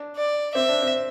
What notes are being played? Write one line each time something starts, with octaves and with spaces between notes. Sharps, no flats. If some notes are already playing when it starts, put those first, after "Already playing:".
Already playing: D4
D5
C4 E5
D4
C4